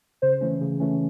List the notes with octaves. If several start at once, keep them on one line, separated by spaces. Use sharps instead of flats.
C#3 C5
E3 A3 C#4
C#3
E3 A3 C#4